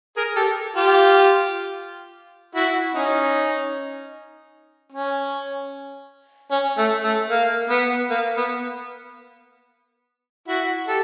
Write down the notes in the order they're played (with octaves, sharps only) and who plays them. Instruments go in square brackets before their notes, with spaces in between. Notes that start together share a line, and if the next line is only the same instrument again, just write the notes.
[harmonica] G#4 A#4
G4 A4
F4 G4
E4 F#4
C#4 D#4
C#4
C#4
A3
A3
A#3
B3
A#3
B3
E4 F#4
G4 A4